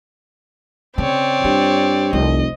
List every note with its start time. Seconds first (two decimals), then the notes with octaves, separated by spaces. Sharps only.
0.98 C#3 C4 C#5 D5
1.44 G2 F4
2.13 F1 C2 D#5